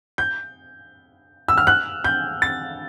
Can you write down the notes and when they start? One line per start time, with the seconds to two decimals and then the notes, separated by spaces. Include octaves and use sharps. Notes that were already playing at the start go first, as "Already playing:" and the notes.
0.18 G6
1.48 E6
1.58 F6
1.67 F#6
2.04 G6
2.42 A6